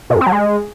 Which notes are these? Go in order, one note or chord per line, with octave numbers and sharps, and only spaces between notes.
B2
F#2
C4
F#3
G#3